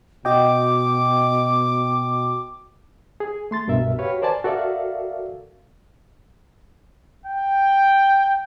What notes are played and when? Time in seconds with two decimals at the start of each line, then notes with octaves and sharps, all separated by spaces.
0.25 B2 F#4 D#5 G5 D6
3.20 G#4
3.51 A3 C6 A6
3.67 C2 G2 B2 A#4 E5
3.98 F#4 G4 B4 C#5 F5
4.22 A#4 C5 D5 G#5 A5
4.44 F#4 A4 A#4 D5 E5 F5
7.26 G5